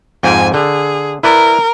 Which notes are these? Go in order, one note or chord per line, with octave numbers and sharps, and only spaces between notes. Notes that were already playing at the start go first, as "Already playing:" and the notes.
F2 G#2 G5 G#5
D3 G#4
E4 A#4 B4 D5